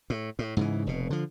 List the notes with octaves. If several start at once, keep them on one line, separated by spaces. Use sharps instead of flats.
A2
A2
G#2 C#3 E3
F1 B2
D3 F3